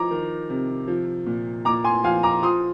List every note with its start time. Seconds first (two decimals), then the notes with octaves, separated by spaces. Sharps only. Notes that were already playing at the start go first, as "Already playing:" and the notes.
Already playing: F3 A#5 D6
0.11 D#3
0.50 C3
0.88 F3
1.26 A#2
1.65 A#2 A#5 D6
1.84 G#5 C6
2.04 F3 F5 G#5
2.23 A#5 D6
2.42 F3 C6 D#6